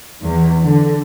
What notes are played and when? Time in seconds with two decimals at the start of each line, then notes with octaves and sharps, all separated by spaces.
0.21 E2
0.63 D3